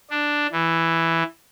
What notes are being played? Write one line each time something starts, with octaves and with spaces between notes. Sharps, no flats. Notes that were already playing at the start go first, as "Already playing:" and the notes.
D4
E3